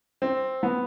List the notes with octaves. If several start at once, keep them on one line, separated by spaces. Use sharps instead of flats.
C4
B3